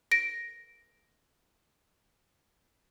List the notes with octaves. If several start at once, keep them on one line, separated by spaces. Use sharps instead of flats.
A#6 D7